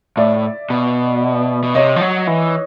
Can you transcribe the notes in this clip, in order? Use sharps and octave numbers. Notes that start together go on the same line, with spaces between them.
A2 D5 E5
B2
B2
C3 C#5 D#5
F3
F#3
E3